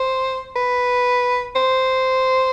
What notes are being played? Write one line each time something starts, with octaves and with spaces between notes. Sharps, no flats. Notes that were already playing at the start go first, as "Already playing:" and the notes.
Already playing: C5
B4
C5